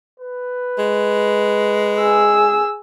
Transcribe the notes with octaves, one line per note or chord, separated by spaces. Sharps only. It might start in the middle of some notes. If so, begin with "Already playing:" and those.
B4
G#3
G#4 E6